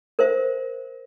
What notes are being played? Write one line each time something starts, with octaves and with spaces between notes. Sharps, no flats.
A#4 C5 E5